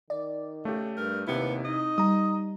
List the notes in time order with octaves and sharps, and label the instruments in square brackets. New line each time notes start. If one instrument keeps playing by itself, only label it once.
[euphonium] D#3 [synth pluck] D5
[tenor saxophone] C#3 [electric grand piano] A3 G4
[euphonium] G2 [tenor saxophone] A#4
[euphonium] D#2 [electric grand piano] C3 E4 [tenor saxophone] B3
[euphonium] D#4 [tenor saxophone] D#5
[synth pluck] G3 [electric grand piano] A#5 D#6